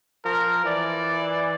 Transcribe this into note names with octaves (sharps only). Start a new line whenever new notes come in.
F3 A#4
E3 D5